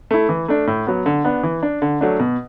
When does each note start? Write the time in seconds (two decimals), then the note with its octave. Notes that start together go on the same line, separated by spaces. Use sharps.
0.11 A3 E4
0.29 E3
0.48 A3 D4
0.67 A2
0.87 F#3 B3
1.06 D3
1.25 B3 D4
1.43 E3
1.63 D4
1.82 D3
2.01 F#3 A3 D4
2.20 B2